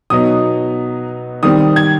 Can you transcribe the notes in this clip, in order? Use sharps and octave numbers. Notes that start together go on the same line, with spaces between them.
B2 F#3 B3 D#4 D#6
D#3 G3 C4 D#6
G#6